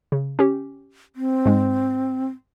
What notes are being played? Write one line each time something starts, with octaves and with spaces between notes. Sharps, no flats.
C#3
C#4 G4
C4
G#2 G#3